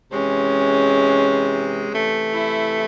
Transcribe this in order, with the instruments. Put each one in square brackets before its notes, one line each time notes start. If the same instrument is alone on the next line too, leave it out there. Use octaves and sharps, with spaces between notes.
[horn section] C3 E3 G#3 [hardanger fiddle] C#4
[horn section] C3 E3 A3
[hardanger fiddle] E4